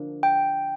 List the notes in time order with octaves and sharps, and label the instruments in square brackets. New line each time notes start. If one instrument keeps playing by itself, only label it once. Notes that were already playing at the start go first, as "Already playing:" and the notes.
Already playing: [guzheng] D3 F3 A#3
[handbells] G5